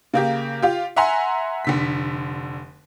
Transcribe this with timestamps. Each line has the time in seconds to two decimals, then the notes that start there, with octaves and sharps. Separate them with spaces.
0.14 C#3 A#3 G4
0.62 F4 G4
0.96 E5 F#5 G#5 A#5 C6
1.65 F1 D3 B6